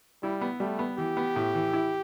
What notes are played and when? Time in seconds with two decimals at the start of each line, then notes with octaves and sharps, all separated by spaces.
0.23 G3 E4
0.41 B3
0.60 G3 A3
0.79 B3
0.98 E3 G4
1.17 B3
1.36 A2
1.55 E3
1.73 E4